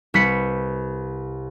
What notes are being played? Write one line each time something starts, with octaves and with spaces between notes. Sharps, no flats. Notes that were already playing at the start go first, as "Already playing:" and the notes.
C2 B4 B6 C#7